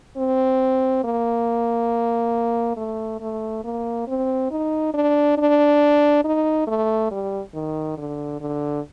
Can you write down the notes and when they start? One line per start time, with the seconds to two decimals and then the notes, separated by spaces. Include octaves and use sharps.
0.17 C4
1.04 A#3
2.77 A3
3.21 A3
3.64 A#3
4.08 C4
4.51 D#4
4.94 D4
5.38 D4
6.24 D#4
6.67 A3
7.11 G3
7.54 D#3
7.98 D3
8.41 D3